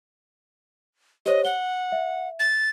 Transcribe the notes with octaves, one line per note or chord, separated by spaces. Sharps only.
G4 C5 C#5 D#5
F#5 G7
E5
A6